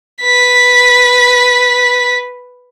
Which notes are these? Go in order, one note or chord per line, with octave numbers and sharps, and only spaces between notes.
B4 B6